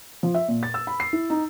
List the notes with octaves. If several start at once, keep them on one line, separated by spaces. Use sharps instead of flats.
F3
E5
A#2
A6
E6
B5
C7
E4
D#4